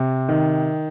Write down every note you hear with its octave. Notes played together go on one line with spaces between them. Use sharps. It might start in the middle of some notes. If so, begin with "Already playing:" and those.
Already playing: C3
D#3